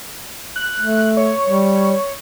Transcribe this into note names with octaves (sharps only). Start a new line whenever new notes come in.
F#6
A3
C#5
G3